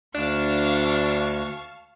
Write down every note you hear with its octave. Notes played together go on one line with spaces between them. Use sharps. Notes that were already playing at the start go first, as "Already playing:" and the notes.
D2 D4 F5 A5 C#6